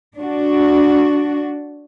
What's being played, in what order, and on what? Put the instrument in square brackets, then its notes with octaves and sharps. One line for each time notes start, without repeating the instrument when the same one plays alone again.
[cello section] D4 F#4